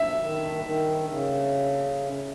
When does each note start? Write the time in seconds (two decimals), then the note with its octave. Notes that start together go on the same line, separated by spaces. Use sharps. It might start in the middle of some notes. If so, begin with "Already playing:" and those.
Already playing: E5
0.21 D#3
0.65 D#3
1.09 C#3